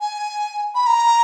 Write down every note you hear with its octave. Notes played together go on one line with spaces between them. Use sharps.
G#5
B5
A#5